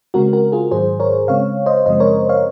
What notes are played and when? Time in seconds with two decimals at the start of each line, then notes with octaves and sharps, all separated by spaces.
0.14 C#3 G#3 C4 F#4 A#4
0.33 F#4 A#4
0.52 F4 G#4
0.71 G#2 D#3 F#3 G#4 C5
1.00 A#4 C#5
1.28 C#3 G#3 C4 C#5 F5
1.66 C5 D#5
1.86 F#2 C#3 F3 G#3 C4 C5 D#5
2.00 A#4 C#5
2.29 C#5 F5